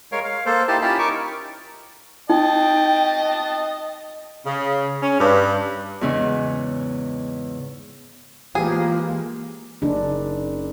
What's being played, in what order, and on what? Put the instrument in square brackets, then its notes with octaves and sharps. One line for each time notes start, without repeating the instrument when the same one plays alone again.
[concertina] G#3 A#4 C#5 F5
F5
A#3 A4 C5
D#4 E4 G4 A5
C#4 E4 F4 G4 A5 B5
D#4 A#4 C#6 D6
[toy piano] D#4 [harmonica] D#5 A5 [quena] G5
[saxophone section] C#3
C#4
G2
[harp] E2 G#2 C#3 C#4
[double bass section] E3 G#3 A#3 [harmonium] F3 [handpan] G4 [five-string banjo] G#4
[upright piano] F#1 C#3 D#4 [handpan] D4